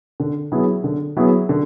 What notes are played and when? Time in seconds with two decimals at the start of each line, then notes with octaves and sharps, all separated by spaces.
0.20 D3
0.52 F#3 B3 E4 G#4
0.84 D3
1.17 F#3 B3 E4 G#4
1.49 D3